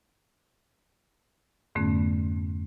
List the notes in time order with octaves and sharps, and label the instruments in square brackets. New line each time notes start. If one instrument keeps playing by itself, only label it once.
[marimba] F2 G#2 D3 A3 B3 C#4